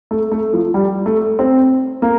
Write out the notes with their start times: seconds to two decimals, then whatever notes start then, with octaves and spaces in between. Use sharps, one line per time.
0.11 A3
0.32 A3
0.53 F3
0.74 G3
1.06 A3
1.39 C4
2.02 A#3